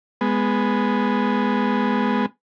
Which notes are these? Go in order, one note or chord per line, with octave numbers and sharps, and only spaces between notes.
G#3 B3